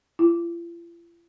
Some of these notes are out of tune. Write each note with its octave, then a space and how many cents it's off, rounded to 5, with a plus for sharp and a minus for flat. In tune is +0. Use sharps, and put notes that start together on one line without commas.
F4 -45